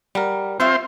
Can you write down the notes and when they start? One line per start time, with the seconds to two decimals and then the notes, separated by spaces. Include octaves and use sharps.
0.15 G3 A#4 F#5
0.60 C4 F4 C5 C#5 E5 C#6